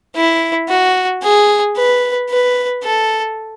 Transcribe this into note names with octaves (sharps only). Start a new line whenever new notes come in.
E4
F#4
G#4
B4
B4
A4